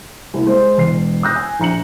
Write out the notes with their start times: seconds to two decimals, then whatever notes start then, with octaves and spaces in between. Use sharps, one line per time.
0.34 C2 A#3
0.47 G#3 C5
0.78 E1 C7
1.23 D#6 E6 F#6 G6 A#6
1.36 G#5
1.60 A#1 A#5 C#7 F#7